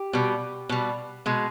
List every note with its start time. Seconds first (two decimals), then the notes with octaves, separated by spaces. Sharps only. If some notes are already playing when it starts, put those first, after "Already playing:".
Already playing: G4
0.13 B2 G3
0.69 B2 G3
1.26 B2 G#3